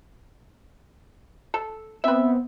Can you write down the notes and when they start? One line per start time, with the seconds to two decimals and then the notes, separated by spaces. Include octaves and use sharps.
1.54 A4
2.04 B3 C4 B4 E5